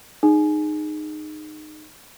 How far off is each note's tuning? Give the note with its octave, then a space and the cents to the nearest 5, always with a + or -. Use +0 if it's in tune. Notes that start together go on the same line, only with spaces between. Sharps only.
D#4 -20 G#4 +0